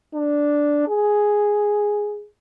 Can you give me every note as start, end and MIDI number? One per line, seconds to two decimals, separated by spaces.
0.15 0.88 62
0.88 2.26 68